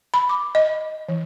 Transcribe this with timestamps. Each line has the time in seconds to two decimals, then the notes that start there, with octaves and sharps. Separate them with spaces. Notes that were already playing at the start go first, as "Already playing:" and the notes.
0.14 B5
0.29 D6
0.55 D#5
1.09 E3